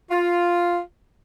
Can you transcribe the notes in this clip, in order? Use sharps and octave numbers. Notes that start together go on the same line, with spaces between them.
F4